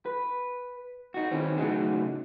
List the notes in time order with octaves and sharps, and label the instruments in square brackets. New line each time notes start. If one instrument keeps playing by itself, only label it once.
[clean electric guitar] B4
D#4 F#4
D#3 E3 C4 C#4
A2 C#3 F#3 D#4 F#4 G#4